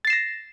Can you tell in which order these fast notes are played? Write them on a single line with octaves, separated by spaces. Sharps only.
A6 C7 E7 A#6